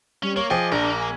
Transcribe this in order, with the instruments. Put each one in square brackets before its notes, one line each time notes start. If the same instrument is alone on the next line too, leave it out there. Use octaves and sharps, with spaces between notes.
[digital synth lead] G3 [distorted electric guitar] C#4
[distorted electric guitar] A#3 [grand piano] C#5
[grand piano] F3 G#4 G5 [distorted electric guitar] D#5 [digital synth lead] D6
[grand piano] A#1 [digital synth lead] D4 [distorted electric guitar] A#4
[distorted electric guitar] A#3
[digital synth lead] G#5